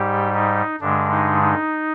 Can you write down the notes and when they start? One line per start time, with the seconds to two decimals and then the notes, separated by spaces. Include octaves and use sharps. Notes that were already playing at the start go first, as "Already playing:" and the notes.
Already playing: G#2 G3 G4
0.34 D#4
0.81 G2 D3 G#3 D4
1.11 D#4
1.42 D#4